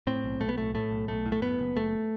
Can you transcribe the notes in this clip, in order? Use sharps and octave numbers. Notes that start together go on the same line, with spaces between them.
A2 C4
B1
B1 A3
B3
A2 A3
A2 A3
B1
B1 A3
A2
A3
F#2 B3
F#1
F#1 A3